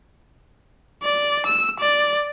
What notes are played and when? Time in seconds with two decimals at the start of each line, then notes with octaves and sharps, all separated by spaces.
1.04 D5
1.46 E6
1.80 D5